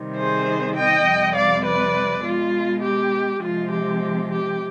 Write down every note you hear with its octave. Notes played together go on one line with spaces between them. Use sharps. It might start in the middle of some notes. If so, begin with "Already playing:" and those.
Already playing: C3 D#3 G3
G#4 C5
D#5 G5
F2 C3 G3
D5 F5
B4 D5
B2 G#3 F4
G4
C3 F3 G#3 F4
G4
G4